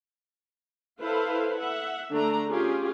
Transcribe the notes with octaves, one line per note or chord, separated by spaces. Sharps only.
E4 A4 B4 C5 F5
E5 F#5
D3 A3 D4 A#5
C#4 F4 G4 G#4